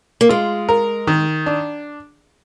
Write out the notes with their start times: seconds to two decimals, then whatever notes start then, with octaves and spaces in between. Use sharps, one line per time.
0.21 A#3
0.29 G#3 F4
0.69 A#4
1.07 D#3
1.46 D4